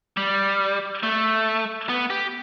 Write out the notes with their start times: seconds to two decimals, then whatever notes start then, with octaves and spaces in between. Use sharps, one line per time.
0.17 G3
1.03 A3
1.89 B3
2.10 G4